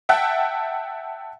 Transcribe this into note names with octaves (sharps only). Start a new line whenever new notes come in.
E5 F#5 G5 A5 F#6